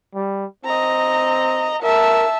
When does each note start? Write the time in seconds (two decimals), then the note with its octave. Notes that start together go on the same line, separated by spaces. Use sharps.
0.15 G3
0.65 C4 D#5 A#5
1.83 A#4 E5 A5